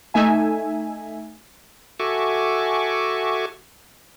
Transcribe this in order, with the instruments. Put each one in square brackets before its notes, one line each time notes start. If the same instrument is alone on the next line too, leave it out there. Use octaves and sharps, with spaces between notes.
[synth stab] A3 D#4 E5 G#5
[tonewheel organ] F#4 A4 E5 G#5 C#6 D6